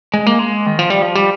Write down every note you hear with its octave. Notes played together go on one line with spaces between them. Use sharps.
G#3
A#3
G#3
D#3
F3
G3
F3
G3